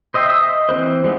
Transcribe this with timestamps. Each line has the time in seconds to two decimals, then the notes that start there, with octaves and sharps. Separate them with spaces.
0.14 C5 D#5 E5 G5 C6
0.26 E5 D#6 E6
0.41 D#5
0.69 E3 C4 B4 C5
1.04 G3 G#3 B3 D#4